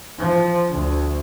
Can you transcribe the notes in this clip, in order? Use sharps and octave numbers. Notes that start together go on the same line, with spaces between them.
F3
D2